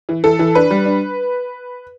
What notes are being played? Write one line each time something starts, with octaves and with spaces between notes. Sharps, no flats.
E3
E3 A4
E3
D4 B4
G3
D4